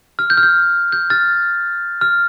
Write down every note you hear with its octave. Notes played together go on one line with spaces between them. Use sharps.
F6
G6
F6
G6
G6
F6 A6
F6